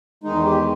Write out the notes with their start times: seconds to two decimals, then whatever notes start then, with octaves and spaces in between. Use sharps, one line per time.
0.24 E2 D#3 G#3 D#4
0.45 G4